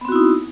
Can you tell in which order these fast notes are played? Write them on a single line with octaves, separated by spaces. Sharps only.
B3 C4 F#4 E4 D#4